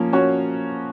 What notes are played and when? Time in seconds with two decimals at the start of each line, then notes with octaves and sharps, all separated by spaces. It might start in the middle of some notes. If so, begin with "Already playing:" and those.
Already playing: F3 A#3 C#4
0.13 A#3 C#4 F#4 C#5